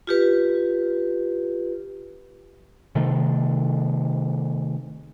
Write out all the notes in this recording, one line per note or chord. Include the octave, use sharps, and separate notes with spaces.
F4 G4 B4
C3 D#3 A3